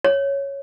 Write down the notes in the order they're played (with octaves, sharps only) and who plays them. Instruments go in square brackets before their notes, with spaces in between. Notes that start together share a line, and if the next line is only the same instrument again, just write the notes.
[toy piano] C#5